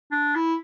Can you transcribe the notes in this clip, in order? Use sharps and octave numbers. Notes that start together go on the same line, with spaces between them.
D4
E4